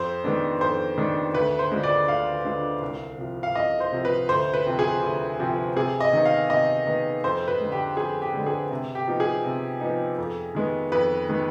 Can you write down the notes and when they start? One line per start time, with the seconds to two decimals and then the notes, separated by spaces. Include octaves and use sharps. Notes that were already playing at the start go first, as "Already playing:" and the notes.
Already playing: F2 C5
0.24 D#3 G#3 B3 D4
0.60 F2 C5
0.98 D#3 G#3 B3 D4
1.34 D2 B4
1.59 C5
1.71 D3 G#3 D4 F4
1.84 D5
2.08 D2 F5
2.45 D3 G#3 D4 F4
2.82 C2
3.18 C3 F3
3.43 F5
3.55 C2 D#5
3.80 C5
3.92 C3 F3
4.05 B4
4.29 D2 C5
4.54 B4
4.66 C3 F3 C4
4.79 G#4
5.03 D2
5.39 C3 F3 C4
5.76 C3 G#4
6.00 D#5
6.13 D#3 B3 D#4
6.25 F5
6.50 C3 D#5
6.87 D#3 B3 D#4
7.24 F2 C5
7.48 B4
7.60 D3 G#3
7.72 G4
7.97 F2 G#4
8.22 G4
8.34 D3 G#3
8.46 G#4
8.71 C3
8.95 G4
9.08 F3 B3 D#4
9.20 G#4
9.45 C3
9.81 F3 B3 D#4
10.18 F2
10.55 D#3 G#3 B3
10.92 F2 B4
11.29 D#3 G#3 B3